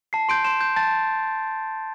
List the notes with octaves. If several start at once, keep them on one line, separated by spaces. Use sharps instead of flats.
A5 C7
C6 G6 D7
C6 E7
G6
A5 A6